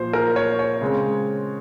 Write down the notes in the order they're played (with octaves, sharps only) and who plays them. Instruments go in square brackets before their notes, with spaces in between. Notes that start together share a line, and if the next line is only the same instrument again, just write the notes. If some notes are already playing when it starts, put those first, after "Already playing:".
Already playing: [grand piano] A#2 F3 C5
A#4
C#5
C#5
C#3 G#3 C4